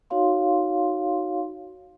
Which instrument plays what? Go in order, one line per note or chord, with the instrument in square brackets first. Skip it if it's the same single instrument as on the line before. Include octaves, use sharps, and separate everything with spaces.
[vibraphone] D#4 F#4 C#5 F5 C6